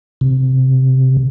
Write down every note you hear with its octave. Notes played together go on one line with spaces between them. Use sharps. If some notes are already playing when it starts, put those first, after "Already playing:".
C3